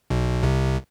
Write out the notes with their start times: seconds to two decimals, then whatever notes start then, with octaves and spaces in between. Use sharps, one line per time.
0.10 B1 B2
0.43 C2 C3